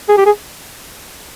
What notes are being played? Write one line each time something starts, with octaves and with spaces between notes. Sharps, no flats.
G#4
G4
G#4